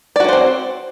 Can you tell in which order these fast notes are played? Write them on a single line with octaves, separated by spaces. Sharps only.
D5 F#4 C#4 C5 C4